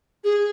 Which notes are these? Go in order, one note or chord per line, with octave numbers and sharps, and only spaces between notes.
G#4